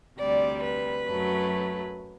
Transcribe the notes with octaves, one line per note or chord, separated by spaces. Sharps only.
D2 C3 G3 D5
B4
F#2 F#3 A3